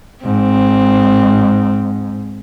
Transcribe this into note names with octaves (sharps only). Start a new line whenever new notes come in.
G#2 C4